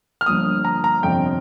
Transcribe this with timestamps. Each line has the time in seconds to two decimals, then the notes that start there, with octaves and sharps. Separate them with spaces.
0.21 F6
0.26 G1 G2 F3 A#3 D#6
0.65 A#5
0.84 A#5
1.03 G1 F2 C3 F3 G5